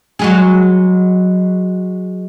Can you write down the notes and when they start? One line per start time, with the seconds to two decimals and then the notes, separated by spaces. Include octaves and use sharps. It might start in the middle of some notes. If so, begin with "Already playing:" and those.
0.19 F#3 G#3 G#4